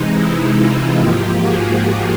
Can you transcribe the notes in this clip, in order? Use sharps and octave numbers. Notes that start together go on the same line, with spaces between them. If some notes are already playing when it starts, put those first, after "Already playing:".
Already playing: C3 E3 G#3 D#4
E4
D#4 F4
G#2 F3 A#3 F4 G4
F#4 G#4
F#4 G#4